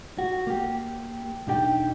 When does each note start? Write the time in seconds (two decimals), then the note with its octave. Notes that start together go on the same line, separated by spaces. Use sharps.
0.19 F#4
0.47 A#3 G4
1.47 B1 E2 D4 D#4 G4 G5